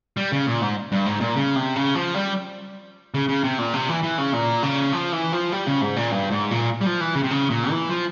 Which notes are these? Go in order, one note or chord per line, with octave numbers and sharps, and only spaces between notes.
G3
C#3
A#2
G#2
G2
G#2
A#2
C#3
C3
C#3
F3
G3
C#3
C#3
C3
A#2
C3
E3
E3
C#3
A#2
C#3
F3
E3
F3
G3
C#3
G#2
A#2
G2
G#2
A#2
G3
F3
E3
C#3
C3
C#3
A#2
E3
F3